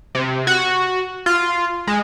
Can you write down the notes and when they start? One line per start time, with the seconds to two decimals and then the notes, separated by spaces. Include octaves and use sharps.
0.15 C3
0.47 F#4
1.26 F4
1.87 G#3